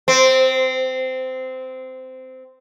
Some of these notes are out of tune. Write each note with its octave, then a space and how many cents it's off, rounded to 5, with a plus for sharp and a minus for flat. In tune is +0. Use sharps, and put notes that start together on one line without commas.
C4 -15